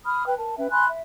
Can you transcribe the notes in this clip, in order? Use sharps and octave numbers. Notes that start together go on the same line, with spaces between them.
B5 D#6 F6
B4 G5
A#4 A5
C#4 B4 E5 G5
G#5 B5 C6 F#6
E5